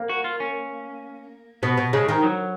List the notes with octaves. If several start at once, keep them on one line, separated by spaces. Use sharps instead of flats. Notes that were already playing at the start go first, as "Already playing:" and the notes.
Already playing: A#3
F#4
F4
C#4
B2 B3
B2
C#3 G#3
D#3
F#3